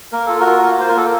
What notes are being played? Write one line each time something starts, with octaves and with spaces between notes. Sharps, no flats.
A#3 A#4
F4 A4
F#4 A#4
F4
A#3
F4 C5
A#4
A#3 A4